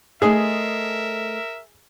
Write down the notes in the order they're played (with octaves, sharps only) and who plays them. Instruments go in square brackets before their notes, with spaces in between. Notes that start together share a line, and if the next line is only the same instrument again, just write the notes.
[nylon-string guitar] A3 C5 D#5 [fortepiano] G#4 [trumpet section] A#4 E5